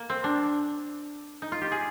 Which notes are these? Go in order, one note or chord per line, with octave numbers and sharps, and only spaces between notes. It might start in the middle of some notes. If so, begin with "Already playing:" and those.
Already playing: A#3
C4
D4
D#4
F4
G4
G#4